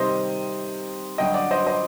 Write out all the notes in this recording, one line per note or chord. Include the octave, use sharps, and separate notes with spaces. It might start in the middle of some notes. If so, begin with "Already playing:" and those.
Already playing: C3 D#3 G3 C4 C5 D#5
G2 D3 F#3 D#5 G5
D5 F#5
C5 D#5
C5 D#5